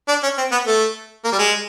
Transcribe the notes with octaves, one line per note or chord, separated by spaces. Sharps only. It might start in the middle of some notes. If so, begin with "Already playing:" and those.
D4
C#4
C4
B3
A3
A#3
G3
G#3